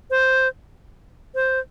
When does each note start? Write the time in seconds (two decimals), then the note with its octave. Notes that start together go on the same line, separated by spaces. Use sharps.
0.10 C5
1.35 C5